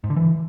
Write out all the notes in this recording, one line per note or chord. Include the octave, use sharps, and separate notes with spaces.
G#2
D3
E3